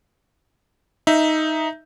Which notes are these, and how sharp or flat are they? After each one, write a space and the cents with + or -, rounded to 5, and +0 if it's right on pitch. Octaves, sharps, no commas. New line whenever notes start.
D#4 +5 E5 +0